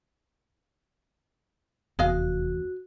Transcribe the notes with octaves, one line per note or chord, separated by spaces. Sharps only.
F1 E2 F#4 G#4 D#5 F5